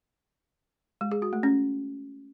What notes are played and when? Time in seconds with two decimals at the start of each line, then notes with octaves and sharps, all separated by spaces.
1.01 G#3
1.12 G#4
1.22 F#4
1.33 A3
1.43 C#4